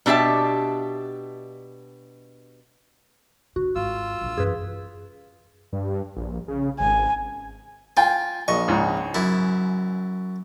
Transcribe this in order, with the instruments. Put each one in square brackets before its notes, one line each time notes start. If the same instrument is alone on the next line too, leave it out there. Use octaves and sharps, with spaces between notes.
[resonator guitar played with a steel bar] B2 D4 G4 E5 A5
[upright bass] D3 [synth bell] F#4
[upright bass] G#1 [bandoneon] F4 E6
[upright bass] A#1 G#3
[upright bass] F#2 E3 [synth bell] G#4 B4
[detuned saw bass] G2
A#1
C#3
[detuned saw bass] G#1 [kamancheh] G#5
[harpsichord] F4 [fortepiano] G5 G#5
[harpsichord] A#1 C#6 [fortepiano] D#5
[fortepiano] C#2 G#2
[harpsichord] F#2 E4